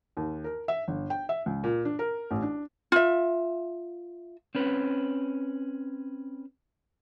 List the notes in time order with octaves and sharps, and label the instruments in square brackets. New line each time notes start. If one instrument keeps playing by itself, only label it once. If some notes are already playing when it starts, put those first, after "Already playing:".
[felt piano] D#2
A#4
E5
G1
G5
E5
C#2
A#2
D4
A#4
A1
D4
[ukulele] F4 E5
[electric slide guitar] C4 C#4 B4